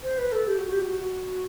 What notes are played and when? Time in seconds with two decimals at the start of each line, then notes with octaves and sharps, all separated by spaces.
0.03 C5
0.18 B4
0.32 A4
0.47 G4
0.58 F#4
0.70 G4
0.81 F#4
0.92 F#4